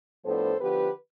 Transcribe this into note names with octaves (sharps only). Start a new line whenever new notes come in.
A2 F3 B3 D4 A4 C5
D3 F3 B3 G4 B4